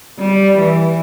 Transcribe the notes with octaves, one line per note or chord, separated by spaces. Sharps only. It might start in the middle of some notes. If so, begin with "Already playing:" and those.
G3
E3